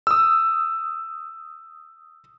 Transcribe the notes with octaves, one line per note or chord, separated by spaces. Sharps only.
D#6 E6